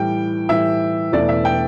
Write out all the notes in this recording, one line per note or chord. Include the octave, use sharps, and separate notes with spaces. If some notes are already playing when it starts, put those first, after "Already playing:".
Already playing: A2 E3 G3 G5
A2 E3 G3 E5
E1 E2 E3 A3 E4 D5
E5
G5